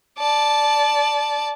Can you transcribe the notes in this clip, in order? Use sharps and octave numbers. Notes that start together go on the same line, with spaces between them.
D5 A5